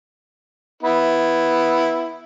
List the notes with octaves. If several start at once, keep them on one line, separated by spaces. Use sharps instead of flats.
B3 E4